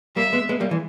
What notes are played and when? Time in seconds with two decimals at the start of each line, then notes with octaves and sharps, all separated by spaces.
0.16 G3 A#3 E5
0.33 G#3 B3
0.49 G#3 B3
0.60 G3 A#3
0.71 E3 G#3